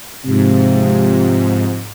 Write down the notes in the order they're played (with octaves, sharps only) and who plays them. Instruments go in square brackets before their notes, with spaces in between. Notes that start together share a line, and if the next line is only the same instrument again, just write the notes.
[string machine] G#2 [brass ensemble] C3 F3